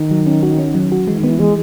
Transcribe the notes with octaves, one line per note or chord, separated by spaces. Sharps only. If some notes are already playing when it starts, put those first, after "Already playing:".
Already playing: D#3
F#3
C#4
F#4
C#4
F#3
F#4
E3 G#3
D#3
B3
E3
E3 G#3